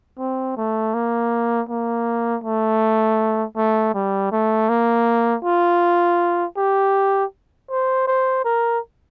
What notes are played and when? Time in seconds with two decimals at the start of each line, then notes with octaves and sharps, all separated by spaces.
0.19 C4
0.57 A3
0.94 A#3
1.69 A#3
2.44 A3
3.57 A3
3.94 G3
4.32 A3
4.69 A#3
5.44 F4
6.57 G4
7.70 C5
8.07 C5
8.45 A#4